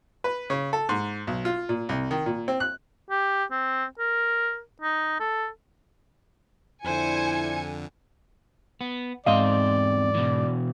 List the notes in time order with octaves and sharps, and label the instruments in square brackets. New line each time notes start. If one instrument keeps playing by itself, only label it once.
[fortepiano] B4
C#3
A4
G#2
B1
F4
A#2
C2
D#3
A#2
C4
F#6
[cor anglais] G4
C4
A#4
D#4
A4
[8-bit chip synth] F2 D3 [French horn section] E4 D5 [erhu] C5 [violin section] G#5 G#6 C#7
[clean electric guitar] B3
[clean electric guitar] E2 C4 C6 [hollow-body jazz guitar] G#2 D#5 F5 [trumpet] D5
[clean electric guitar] B2 E3